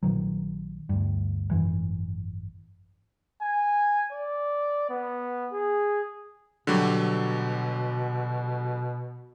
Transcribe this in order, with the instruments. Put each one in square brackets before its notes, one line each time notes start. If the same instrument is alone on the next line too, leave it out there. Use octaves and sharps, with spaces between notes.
[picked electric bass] A#1 A#2 D#3 F#3
D2 G2
G#1 F#2 E3
[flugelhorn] G#5
D5
B3
G#4
[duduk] B2 [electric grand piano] D3 F#3 G3